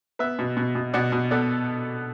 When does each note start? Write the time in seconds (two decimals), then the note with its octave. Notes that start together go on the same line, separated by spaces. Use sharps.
0.19 B3 B4 E5
0.39 B2
0.57 B2
0.75 B2
0.93 B2 D5 F#5
1.12 B2
1.31 B3 A4 D5